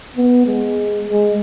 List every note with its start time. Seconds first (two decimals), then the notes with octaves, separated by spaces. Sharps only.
0.17 B3
0.46 G#3
1.06 G#3